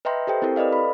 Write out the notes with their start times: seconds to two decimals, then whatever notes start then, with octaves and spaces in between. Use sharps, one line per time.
0.05 B4 D#5 E5 G5 A#5 C6
0.27 G4 A4 C5 G5
0.42 C4 E4 G4 A4 A#4
0.56 A4 B4 D5 D#5 F5
0.73 B5